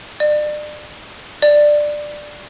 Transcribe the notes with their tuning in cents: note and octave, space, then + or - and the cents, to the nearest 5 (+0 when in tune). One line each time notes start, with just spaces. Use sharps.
D5 +35
D5 +10